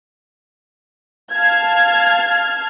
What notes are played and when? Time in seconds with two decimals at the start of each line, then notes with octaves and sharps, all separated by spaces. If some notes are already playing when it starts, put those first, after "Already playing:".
1.33 F5 A5 F6 G#6